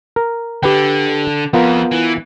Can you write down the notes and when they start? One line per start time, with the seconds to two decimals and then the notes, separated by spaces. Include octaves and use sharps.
0.16 A#4
0.63 D3 G4 B4 G5
1.53 F2 B3 F4 A#4
1.91 E3